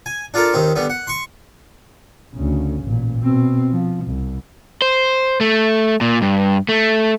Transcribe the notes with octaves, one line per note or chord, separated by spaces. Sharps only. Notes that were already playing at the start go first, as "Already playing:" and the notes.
G#5
D4 F4 A4 A#4
D#2 D#3 C4
D3 G3 B3
F#5
C6 C#6
D2 C#3
A1 A#2
B2 C4
F3
C2
C5
A3
A#2
G2
A3